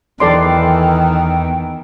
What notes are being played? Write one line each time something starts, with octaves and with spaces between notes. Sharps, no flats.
E2 D#3 E3 A4 D5 G5 C6